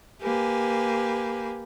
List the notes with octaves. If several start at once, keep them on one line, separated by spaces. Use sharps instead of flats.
A#3 G4 B4 G#5